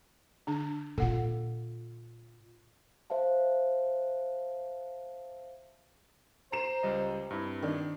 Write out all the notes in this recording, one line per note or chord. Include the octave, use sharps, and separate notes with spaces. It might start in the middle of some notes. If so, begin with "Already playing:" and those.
D3 D4
A#2 F4 A4 F#5
C5 E5 F5 A5
C5 A#5 C7 E7
C#2 G3 D#5
G2 C4 E4
D#3 D4